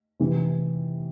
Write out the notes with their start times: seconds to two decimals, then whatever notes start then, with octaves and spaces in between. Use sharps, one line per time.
0.20 C3 E3